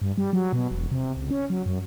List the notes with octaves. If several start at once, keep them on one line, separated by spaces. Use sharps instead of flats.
G2
G3
F#3
B2
E1
C3
C#2
C#4
F#3
F#2